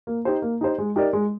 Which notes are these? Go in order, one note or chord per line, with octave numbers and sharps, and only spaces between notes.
A#3
D#4 G4 C5
A#3
D#4 G4 C5
G#3
D#4 G4 A#4 D5
G#3